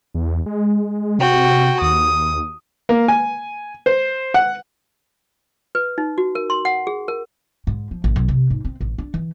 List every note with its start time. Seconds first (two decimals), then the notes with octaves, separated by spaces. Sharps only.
0.14 E2
0.46 G#3
1.19 C3 F#4 G5
1.82 D#2 D#6
2.89 A#3
3.08 G#5
3.86 C5
4.34 F#5
5.75 B4
5.98 D#4
6.18 F#4
6.35 A#4
6.50 C6
6.65 F#5
6.87 G#4
7.08 A#4
7.67 G#2
7.91 F3
8.04 A1
8.16 B1
8.28 C3
8.50 G#2
8.65 C4
8.81 A1
8.98 D4
9.14 E3